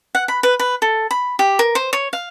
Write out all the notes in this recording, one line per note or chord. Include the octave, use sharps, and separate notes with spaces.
F#5
B5
B4
B4
A4
B5
G4
A#4
C5
C#5
F5